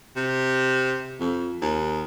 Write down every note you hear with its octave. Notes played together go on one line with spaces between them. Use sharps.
C3
F2
D#2